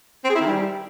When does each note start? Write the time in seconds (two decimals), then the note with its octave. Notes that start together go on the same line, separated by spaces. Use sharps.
0.24 C4
0.30 G#4
0.35 E4
0.41 D#3
0.46 G3